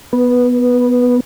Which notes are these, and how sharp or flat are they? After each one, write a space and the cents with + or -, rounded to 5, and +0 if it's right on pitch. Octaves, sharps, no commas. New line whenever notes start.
B3 +0 B4 -10